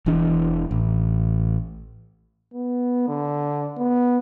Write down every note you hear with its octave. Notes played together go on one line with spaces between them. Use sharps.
E1 E2 E3 D4
A1
B3
D3
B3